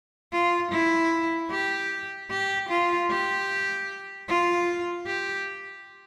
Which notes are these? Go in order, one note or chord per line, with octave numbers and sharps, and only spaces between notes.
F4
E4
G4
G4
F4
G4
F4
G4